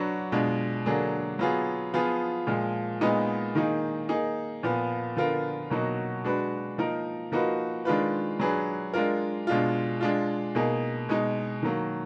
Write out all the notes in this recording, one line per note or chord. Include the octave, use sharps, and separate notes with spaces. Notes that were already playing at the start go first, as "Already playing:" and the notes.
Already playing: F#3 D4 F#4 B4
B2 G#3 D4 F4
D3 F#3 A#3 D4 G#4
F#3 B3 F4 G#4
F3 B3 F4 G#4
A#2 F3 G#3
A#2 G#3 B3 D#4
D#3 A#3 D#4 G#4
A#3 D#4 G#4
A#2 F3 B3
D3 F3 B3 F4 A#4
B2 F#3 A#3 D#4 F#4
G#3 D4 F#4 B4
F3 A#3 D#4 A#4
F3 A#3 D#4 F#4 B4
D#3 G#3 D4 F4 B4
F#3 D4 G#4 B4
G#3 D4 F4 A#4
B2 G#3 D4 F4
G#3 D4 F4
B2 A#3 D#4 G#4
B2 G#3 D#4
D#3 F#3 A#3